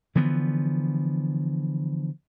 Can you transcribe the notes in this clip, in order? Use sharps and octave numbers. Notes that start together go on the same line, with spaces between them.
D3 E3 F3 B3